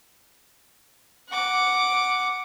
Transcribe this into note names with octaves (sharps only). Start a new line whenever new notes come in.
F#5 D6